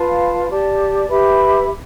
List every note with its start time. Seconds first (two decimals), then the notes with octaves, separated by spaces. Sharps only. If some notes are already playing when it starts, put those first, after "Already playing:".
Already playing: F4 B4 F5 A5
0.49 G4 D5 A5
1.08 G4 B4 E5 B5